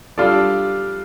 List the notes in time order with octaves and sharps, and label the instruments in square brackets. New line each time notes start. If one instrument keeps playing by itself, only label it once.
[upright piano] G3 D4 F4 A4 D5